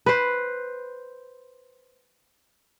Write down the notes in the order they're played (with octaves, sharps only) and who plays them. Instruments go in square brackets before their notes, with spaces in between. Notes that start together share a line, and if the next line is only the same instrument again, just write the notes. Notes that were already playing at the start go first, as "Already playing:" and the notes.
[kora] B4 C5